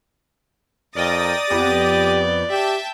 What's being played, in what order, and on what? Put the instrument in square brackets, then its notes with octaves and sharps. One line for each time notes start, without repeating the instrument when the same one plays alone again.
[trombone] F2 [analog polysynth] A#4 D#5 G5 [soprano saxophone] D5 [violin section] D#6 A6 A#6
[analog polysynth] F2 B3 G6 [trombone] G4
[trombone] G4 [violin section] E5 G5 A5